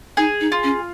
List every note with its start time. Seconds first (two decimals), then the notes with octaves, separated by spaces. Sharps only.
0.17 D#4 G#4
0.41 D#4
0.52 F4
0.63 C#4